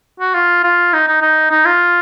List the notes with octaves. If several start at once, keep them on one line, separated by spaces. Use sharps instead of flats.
F#4
F4
F4
D#4
D#4
D#4
D#4
F4